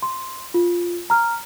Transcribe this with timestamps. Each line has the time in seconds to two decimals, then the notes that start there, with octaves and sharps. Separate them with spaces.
0.02 C6
0.54 F4
1.10 A#5 F6